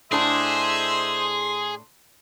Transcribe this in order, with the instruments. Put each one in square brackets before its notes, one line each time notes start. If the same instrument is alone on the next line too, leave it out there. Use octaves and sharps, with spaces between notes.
[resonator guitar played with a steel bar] A2 D4 A5 [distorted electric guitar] G#4 [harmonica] C5 D#5 E5 [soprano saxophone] C6